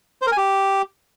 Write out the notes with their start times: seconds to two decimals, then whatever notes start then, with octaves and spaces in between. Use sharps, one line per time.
0.22 C5
0.27 A#4
0.32 G#5
0.37 G4